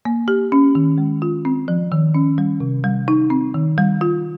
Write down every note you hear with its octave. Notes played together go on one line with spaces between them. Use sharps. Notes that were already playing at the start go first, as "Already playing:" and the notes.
A#3
G4
C#4
D#3
G#3
F4
C4
F3
D#3
C#4
G3
C3
G3
D#4
C4
D#3
G3
F4